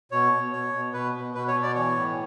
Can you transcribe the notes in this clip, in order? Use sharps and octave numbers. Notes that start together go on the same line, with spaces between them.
B2 C#5
B2
B2 C#5
B2
B2 B4
B2
B2 B4
C#5
B2
D5
E3 C#5
A2